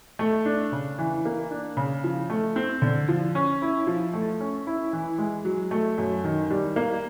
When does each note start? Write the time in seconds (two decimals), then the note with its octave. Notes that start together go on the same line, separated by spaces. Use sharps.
0.19 A3
0.45 D4
0.72 C#3
0.98 E3
1.25 A#3
1.50 D4
1.77 C#3
2.04 F3
2.30 A3
2.56 C4
2.82 D3
3.08 F3
3.35 C#4
3.62 E4
3.87 F3
4.14 A3
4.40 C#4
4.67 E4
4.93 E3
5.18 G#3
5.45 F#3
5.71 A3
5.98 F#2
6.24 D#3
6.50 G3
6.76 A#3